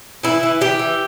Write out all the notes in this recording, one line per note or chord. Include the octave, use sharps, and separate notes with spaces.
E3 E4
E3
E3 G4
E3